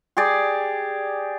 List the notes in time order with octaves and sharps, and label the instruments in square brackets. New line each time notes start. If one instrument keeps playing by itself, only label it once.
[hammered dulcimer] G4 G#4 D5